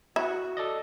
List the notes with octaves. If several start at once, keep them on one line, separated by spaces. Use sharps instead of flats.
E4 F#4
A4 D5 D#5